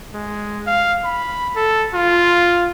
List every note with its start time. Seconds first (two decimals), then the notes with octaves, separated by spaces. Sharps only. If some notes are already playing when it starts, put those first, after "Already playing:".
0.14 G#3
0.67 F5
1.04 B5
1.56 A4
1.94 F4